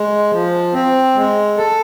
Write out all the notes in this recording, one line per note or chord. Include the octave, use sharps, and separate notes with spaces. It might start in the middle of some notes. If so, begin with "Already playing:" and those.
Already playing: G#3
F3
C4
G#3
A4